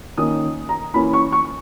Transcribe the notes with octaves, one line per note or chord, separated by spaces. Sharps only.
D#3 A#3 C#4 D#6
A#5
E3 A#3 C#4 B5
C#6
C#6